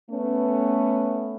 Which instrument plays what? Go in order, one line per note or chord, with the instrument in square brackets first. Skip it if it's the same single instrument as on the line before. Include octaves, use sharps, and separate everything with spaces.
[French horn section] A3 B3 C#4